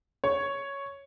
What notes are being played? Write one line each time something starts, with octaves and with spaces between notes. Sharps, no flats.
C#5